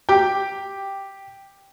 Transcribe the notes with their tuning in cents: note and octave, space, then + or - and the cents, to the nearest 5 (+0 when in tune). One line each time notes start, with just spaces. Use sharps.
G4 +0 G5 +0